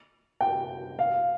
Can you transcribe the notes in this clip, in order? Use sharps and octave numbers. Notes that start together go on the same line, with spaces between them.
G5
F5